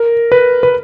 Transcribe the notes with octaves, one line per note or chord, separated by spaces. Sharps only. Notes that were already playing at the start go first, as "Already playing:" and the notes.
Already playing: A#4
B4
B4